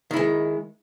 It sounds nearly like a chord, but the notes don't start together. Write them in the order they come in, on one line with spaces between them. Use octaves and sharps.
D#3 E4 G#3